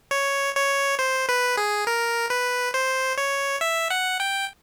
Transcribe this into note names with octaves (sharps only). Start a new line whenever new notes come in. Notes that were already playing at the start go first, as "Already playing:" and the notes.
C#5
C#5
C5
B4
G#4
A#4
B4
C5
C#5
E5
F#5
G5